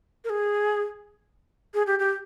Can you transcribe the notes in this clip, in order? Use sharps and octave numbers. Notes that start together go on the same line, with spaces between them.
A#4
G#4
G#4
G4
G4